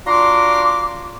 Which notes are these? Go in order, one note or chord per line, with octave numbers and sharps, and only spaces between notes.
D4 F4 F#4 A#5 C6 D6